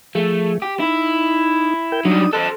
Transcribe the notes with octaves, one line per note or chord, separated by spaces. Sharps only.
F3 A3 G#4
G4
D#4 E4
A#4 G5 G6
F#3 G3 D4 D#4 D#6
A4 C5 D#5 F#6